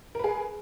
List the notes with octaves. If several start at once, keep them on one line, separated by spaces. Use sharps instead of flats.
G#4 A#4 B4